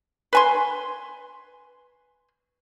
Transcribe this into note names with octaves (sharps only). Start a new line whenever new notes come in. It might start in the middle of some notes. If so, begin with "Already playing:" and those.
B4 G#5 C6